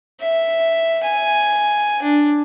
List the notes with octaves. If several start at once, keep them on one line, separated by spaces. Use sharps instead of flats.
E5
G#5
D4